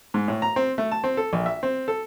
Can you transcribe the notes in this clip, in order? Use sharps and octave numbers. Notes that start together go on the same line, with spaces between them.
G#2
A2
A#5
C4
A3
A5
C4
A4
A#1
E5
C4
A4